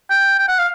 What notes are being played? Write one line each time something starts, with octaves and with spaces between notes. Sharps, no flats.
G5
G5
F#5
F5